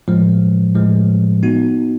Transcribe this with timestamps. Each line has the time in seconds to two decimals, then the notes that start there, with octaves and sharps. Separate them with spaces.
0.08 A2 F3 G#3
0.75 A2 F3 G#3
1.43 B3 D#4 F#4